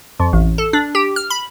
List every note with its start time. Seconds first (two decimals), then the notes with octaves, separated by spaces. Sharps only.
0.20 F2
0.33 A1
0.58 A4
0.73 D4
0.95 G4
1.16 F6
1.30 B5